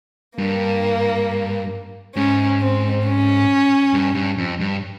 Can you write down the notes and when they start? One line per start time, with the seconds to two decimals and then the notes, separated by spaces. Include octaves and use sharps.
0.38 G2 A#3
2.15 G#2 C#4
2.60 C4
3.05 C#4
3.93 G2
4.15 G2
4.38 F2
4.60 G2